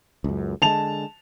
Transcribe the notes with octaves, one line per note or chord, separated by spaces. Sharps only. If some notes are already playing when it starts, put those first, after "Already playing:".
C#2 F#2
D3 G#3 A5 F7